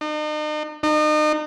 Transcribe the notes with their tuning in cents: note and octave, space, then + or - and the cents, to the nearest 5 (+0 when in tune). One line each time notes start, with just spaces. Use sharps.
D#4 -40
D#4 -35